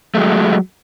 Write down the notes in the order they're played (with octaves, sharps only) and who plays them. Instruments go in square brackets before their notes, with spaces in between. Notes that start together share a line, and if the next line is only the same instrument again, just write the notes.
[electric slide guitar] F#3 G#3 A3